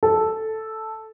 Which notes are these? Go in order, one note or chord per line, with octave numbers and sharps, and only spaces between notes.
A4